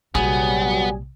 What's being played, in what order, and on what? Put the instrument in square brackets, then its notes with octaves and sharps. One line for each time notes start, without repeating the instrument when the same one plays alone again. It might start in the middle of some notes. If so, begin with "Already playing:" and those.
[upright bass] A#1 C3 [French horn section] F#3 G3 [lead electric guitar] B3 [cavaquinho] G#4